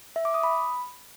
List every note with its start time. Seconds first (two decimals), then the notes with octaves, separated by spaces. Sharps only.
0.16 E5
0.25 D6
0.34 D#6
0.43 B5